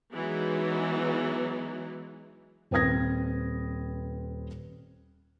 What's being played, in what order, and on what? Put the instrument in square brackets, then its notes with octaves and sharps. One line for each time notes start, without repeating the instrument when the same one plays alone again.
[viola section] E3 F#3 G#3 B3 D#4
[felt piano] D#1 C4 B4 D#6 G#6 A#6